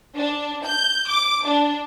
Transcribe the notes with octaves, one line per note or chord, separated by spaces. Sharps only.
D4
G6
D6
D4